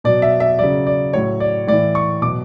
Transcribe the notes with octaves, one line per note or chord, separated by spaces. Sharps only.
B2 F#3 D5
E5
E5
C#3 F#3 D5
D5
A2 F#3 C#5
D5
A2 E3 D5
C#6
B2 F#3 D6